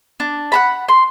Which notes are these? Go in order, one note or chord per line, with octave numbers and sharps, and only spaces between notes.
D4
F#5 A5 B5
C6